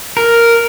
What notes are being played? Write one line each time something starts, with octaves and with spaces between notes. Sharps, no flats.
A#4